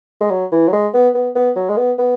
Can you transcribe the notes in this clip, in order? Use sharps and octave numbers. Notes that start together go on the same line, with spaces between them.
G#3
F#3
E3
F#3
G#3
B3
B3
B3
F#3
G#3
B3
B3